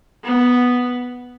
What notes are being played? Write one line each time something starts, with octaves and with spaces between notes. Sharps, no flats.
B3